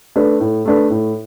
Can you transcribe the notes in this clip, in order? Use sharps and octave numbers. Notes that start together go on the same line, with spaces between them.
A3 D4 B4
A2
A3 D4 B4
A2